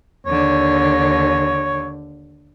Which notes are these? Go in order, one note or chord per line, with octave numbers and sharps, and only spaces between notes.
D#2 D3 C#5